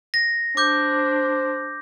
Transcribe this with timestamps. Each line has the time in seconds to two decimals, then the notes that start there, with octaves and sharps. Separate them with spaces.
0.14 A#6
0.57 D4 C5 D6 G6